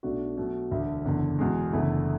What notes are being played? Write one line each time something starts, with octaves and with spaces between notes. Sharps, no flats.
B1 B2 A3 D4 F#4
B2 F#3 A3
E1 D2 D3
F#1 E2 D3
E2 B2 G#3
F#1 E2 D3 A3 E4